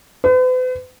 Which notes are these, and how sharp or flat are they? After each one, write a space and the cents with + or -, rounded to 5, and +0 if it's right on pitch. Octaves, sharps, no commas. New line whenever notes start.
B4 +45